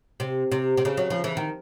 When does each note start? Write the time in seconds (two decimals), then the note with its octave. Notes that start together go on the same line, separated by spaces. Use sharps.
0.20 C3
0.52 C3
0.77 C3
0.85 C#3
0.97 F#3
1.10 F3
1.24 E3
1.37 D#3